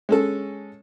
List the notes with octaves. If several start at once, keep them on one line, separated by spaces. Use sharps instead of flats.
G#3 C#4 A4